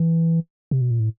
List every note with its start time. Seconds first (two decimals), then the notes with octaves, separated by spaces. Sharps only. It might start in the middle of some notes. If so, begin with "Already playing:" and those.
Already playing: E3
0.71 C3
0.81 B2
0.91 A#2
1.00 A2